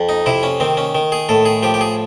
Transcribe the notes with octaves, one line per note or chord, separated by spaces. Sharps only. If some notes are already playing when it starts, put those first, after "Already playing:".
Already playing: F2
D#4
C3 E4
C#4
D#3 C4
C#4
D#3
G#4
A2 A4
G#4
F3 G4
G4
G#4